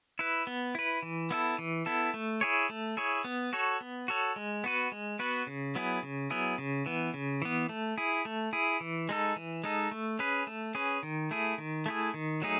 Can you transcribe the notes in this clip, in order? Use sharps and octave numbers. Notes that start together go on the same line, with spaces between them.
E4 B4
B3
E4 B4
E3
B3 E4 A4
E3
B3 E4 A4
A3
E4 G#4 C#5
A3
E4 G#4 C#5
B3
F#4 A4 C#5
B3
F#4 A4 C#5
G#3
B3 F#4 B4
G#3
B3 F#4 B4
C#3
F#3 B3 E4 G#4
C#3
F#3 B3 E4 G#4
C#3
E3 B3
C#3
E3 B3
A3
E4 G#4
A3
E4 G#4
E3
G#3 D#4 A4
E3
G#3 D#4 A4
A3
C#4 G#4 B4
A3
C#4 G#4 B4
D#3
A3 E4 G#4
D#3
A3 E4 G#4
D#3
F#3 A3 D#4 G#4